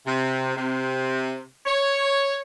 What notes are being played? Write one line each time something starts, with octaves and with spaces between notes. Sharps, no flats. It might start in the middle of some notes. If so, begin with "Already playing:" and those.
C3
C3
C#5